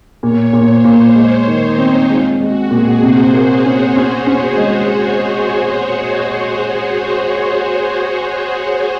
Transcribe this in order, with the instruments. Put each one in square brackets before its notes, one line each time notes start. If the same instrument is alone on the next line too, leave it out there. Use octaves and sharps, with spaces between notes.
[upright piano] A#2 [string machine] C#5
[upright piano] A#2
[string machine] C5
[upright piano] A#2
[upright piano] G#3 [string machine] C5
[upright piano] D#3
[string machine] D#4
[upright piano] C4
[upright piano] G#3 [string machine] F4
[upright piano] G#3 [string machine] F#4
[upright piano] A#2 [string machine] G#4
[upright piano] C3 [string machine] C5
[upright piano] A#3
[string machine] C#5
[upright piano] C#4
C#4
C#4
G#3